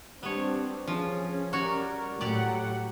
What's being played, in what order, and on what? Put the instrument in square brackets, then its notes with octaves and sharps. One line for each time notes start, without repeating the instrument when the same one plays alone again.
[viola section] G3 C4 D4 [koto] B3 C#5
[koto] F3 [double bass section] C#4 [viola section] G#4
[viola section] G3 A#4 D5 [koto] F#4 C#5
[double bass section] A2 [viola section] F#3 F#5 [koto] G4 D5